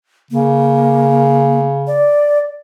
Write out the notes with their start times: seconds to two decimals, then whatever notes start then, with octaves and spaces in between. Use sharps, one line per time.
0.31 C#3 A#3
1.87 D5